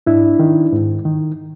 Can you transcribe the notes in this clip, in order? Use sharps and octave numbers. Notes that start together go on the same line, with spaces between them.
G#2 D4 E4
D#3
G#2
D#3